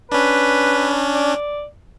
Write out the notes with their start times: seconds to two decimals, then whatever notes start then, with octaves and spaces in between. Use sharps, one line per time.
0.12 C#4 D4 B4
1.14 D5